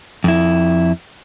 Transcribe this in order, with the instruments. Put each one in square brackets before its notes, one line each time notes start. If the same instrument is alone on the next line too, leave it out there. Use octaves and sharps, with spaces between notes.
[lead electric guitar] F2 E4